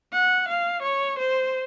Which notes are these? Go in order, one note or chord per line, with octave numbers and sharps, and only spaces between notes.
F#5
F5
C#5
C5